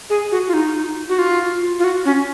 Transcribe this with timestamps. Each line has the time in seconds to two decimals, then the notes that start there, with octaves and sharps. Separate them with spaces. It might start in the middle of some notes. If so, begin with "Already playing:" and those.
0.10 G#4
0.32 F#4
0.48 F4
0.54 D#4
1.09 F#4
1.19 F4
1.79 F4
1.84 F#4
2.05 C#4